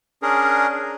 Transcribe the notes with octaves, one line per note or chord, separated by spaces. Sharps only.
C#4 D4 G#4 A#4